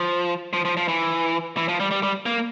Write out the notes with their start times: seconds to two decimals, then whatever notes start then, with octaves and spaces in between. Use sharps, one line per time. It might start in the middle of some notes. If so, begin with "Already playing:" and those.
Already playing: F3
0.53 F3
0.65 F3
0.77 F3
0.88 E3
1.57 E3
1.68 F3
1.80 G3
1.91 G3
2.03 G3
2.26 A#3